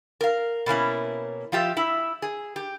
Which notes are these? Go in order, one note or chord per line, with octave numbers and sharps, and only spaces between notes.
A#4 F5
B2 A#3 C#4 E4
F3 F4 G4 E5
E4 E5
G#4
G4